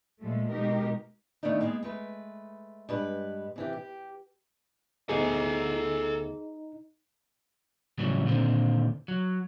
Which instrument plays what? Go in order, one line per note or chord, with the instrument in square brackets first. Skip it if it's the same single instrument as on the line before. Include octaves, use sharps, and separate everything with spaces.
[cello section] A#2 F3 G#3 A3
B2 G#3 D#4 G4 A#4
[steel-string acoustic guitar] D#3 F3 A3 B3 D4 D#4
G#3 A#3 B3 G#4
G#3 A3 B4
G2 G#3 B4
C3 E3 G4
G4
[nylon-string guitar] D2 B3 [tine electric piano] D#4 [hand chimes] G#4 [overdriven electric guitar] A4 G#5
[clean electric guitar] A2 C#3 E3 F#3 G3
A#2 D3 D#3 C4
F#3